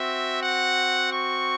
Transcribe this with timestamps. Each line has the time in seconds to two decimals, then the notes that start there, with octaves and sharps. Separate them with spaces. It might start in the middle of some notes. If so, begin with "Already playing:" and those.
Already playing: C4 F#4 E5
0.43 F#5
1.12 C#6